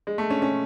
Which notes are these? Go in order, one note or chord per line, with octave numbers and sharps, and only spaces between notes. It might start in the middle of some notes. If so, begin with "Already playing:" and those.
G#3
A3
C#4
C#4